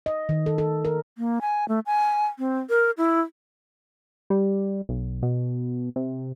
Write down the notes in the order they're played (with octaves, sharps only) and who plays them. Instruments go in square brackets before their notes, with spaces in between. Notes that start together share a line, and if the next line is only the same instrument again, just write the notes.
[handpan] D#5
D#3
A4
A4
A#4
[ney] A#3
G#5
A3
G#5
C4
A#4
E4
[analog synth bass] G3
B1
B2
C3